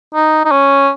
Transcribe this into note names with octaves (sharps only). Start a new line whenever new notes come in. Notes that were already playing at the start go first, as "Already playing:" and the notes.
D#4
D#4
C#4